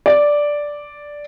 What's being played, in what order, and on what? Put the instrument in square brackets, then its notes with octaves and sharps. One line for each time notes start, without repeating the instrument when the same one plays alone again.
[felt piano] D5